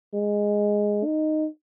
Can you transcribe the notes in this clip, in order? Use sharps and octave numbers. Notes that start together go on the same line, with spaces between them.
G#3
D#4